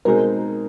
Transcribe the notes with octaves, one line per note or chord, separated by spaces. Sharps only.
B2 G#3 C4 D#4 G#4 A#4